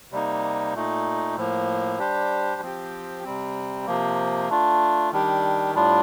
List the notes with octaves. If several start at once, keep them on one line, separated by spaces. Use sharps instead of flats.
C3 G3 A#3 D#4
A#2 A3 D#4
A2 F3 A#3
G3 D4 G4 C5
F3 C4 G4
C3 G3 C4
C3 F3 A#3
A3 D4 F4
D#3 G3 D4 G4
A2 G3 D4 F4